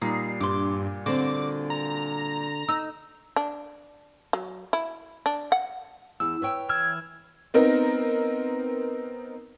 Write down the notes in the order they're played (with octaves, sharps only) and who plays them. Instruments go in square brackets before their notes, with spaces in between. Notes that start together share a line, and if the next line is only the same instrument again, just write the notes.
[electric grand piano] A#2 G3 [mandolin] D#4 [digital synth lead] C7
[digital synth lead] G2 [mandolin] C6 D6
[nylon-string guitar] D3 C4 [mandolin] F#4 [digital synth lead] D6
[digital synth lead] A#5
[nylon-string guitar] D#4 [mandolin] E6
[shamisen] D4
F#3
E4
D4
F#5
[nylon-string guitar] E2 [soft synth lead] E6
[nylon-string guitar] B4 C#5 G5
[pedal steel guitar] E3 E6 F6 [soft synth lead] G#6
[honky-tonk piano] B3 C4 D#4 A#4